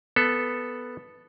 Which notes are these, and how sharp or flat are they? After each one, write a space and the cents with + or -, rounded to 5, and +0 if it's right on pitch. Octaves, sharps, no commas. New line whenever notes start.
B3 +0 A4 +0